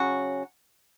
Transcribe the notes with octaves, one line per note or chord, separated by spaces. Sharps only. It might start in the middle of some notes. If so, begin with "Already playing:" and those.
Already playing: C#3 F#3 C#4 F#4